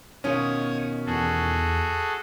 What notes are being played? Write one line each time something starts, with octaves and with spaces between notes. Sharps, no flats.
B2 D#3 C#4 F4 C#5 D#6
E2 F#4 G#4 A4